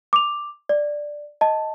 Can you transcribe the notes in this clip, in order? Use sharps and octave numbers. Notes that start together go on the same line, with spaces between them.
D6 F7
D5
D#5 A5